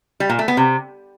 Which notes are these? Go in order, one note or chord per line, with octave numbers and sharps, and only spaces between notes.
G3
A#2
A3
B3
C3